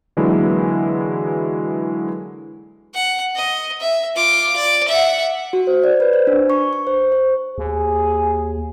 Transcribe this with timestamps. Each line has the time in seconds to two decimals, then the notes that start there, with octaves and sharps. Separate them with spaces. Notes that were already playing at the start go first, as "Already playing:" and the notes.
0.17 D3 E3 F#3 G#3 A#3 E4
2.95 F#5
3.36 D#5
3.81 E5
4.15 F4 D6
4.56 D5
4.88 E5 F#5
5.53 F#4
5.67 C5
5.84 D5
6.00 B4
6.13 C5
6.27 D4
6.50 C#6
6.73 C#6
6.87 C5
7.12 C5
7.58 D#2 G#4